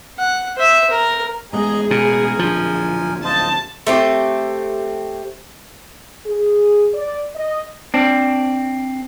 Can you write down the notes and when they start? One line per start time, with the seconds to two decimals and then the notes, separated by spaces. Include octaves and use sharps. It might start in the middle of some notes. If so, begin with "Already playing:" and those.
0.18 F#5
0.57 C5 E5
0.90 A#4
1.53 A1 G#3 B3 G#4 D#5 A#5
1.91 B2 A#4 G#5
2.39 D1 A#1 F3 D4
3.24 F4 C5 D#5 A5
3.87 A3 C4 G4
6.26 G#4
6.94 D5
7.35 D#5
7.94 C4 D4